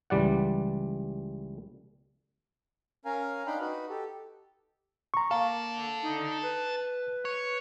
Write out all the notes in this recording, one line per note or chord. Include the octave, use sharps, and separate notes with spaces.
C#2 E3 G3 D5 F#5
C#4 A#4 F5 G#5 A#5
D4 D#4 F5 G5 A#5 B5
D#4 F#4 B4
G4 A4
A#5 C#6
A#3 D4 A4 F5
D#4
B4
C#5